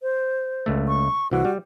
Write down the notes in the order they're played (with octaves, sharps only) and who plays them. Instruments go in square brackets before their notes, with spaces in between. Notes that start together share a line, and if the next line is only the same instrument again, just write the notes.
[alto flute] C5
[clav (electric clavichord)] C#2 A3
[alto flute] C#6
[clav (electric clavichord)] C2 E3 [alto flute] F#4
[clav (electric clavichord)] G3